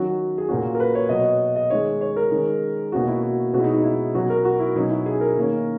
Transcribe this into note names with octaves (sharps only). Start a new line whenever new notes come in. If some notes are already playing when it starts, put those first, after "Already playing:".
Already playing: D#3 F#3 C#4 F#4
G#4
A#2 A#3 C#4 F#4
A#4
B4
C#5
B2 F#3 B3 D#5
C#5
D#5
D#5
D#3 G#3 C#4 C#5
C#5
A#4
D#3 G#3 C#4
B2 A#3 C#4 F#4
E4
F#4
B2 G#3 C#4 F#4
E4
D#4
D#4
E4
B2 F#3 C#4 F#4
A#4
F#4
E4
B2 F#3 C#4 D#4
E4
G#4
A#4
D#3 A#3 C#4